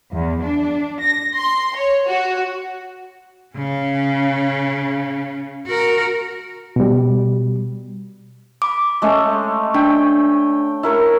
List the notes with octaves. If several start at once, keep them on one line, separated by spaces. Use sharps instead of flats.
E2
D4
A#6
C6
C#5
F#4
C#3 C#4
F#4 A#4
B2 G3
B5 D6
G#3 A3 C#4
D4 G5
E4 A#4 C#6